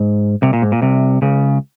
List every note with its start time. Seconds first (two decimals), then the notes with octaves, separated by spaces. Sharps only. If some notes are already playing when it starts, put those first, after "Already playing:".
Already playing: G#2
0.42 C2 C3
0.53 A#2
0.62 G#2
0.72 A#2
0.82 C2 C3
1.22 C#2 C#3